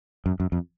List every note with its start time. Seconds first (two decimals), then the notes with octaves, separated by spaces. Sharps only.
0.26 F#2
0.40 F#2
0.52 F2